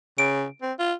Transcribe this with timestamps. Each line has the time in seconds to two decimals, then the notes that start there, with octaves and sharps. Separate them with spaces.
0.18 C#3 D7
0.62 C4
0.79 F4